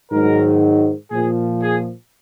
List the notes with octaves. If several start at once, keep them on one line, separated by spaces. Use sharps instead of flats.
G#2 D#3 F#3 A#4
A#2 F3 G#4
G#4